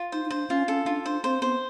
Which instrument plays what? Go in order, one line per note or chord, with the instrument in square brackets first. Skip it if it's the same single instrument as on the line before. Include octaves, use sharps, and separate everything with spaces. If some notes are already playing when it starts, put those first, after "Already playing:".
Already playing: [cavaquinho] F4
[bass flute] D#4 [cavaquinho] C5
[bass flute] D#4
[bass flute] D4 [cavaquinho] C5
[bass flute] C#4 [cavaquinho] F4
[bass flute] C#4 [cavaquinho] A4
[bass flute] D4 [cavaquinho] F4
[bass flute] D4 [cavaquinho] C5
[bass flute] C4 [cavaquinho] C5
[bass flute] B3 [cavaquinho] C5